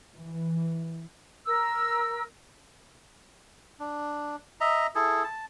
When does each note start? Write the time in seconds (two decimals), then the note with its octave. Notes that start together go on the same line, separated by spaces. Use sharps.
0.14 E3
1.46 A#4 E6
3.80 D4
4.61 D#5 E5 A#5
4.95 E4 G#4 A4
5.24 A5